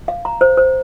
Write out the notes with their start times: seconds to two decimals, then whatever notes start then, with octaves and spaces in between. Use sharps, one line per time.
0.08 F5
0.25 A#5
0.41 C5
0.57 C5